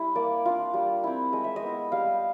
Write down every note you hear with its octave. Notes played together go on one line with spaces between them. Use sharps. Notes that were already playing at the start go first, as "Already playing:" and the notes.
Already playing: G3 E4
A#3 D5
D4 F4
G3
C4 E4
G#3 D#5
E5
D#5
B3 E4
G3 F5